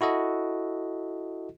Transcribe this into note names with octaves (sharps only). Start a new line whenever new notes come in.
E4 F#4 A4 D#5